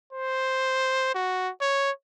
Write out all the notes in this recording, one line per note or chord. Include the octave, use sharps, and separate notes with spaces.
C5
F#4
C#5